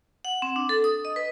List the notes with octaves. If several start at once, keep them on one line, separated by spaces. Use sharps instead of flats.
F#5
C4
D4
A4
D#6
D#5
B4